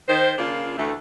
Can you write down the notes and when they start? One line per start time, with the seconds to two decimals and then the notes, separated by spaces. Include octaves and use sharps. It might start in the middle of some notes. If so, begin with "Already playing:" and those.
0.08 D#3 C5
0.38 C#3 A#3 D4 F4
0.77 D2 E3 A3